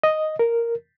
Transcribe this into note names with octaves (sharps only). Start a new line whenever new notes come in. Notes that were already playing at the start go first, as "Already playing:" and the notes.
D#5
A#4